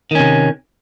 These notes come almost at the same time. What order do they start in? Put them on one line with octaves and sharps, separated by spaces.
D#3 C#4 C3